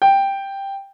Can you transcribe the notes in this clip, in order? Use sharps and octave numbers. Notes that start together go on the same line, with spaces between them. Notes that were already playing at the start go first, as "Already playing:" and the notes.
G5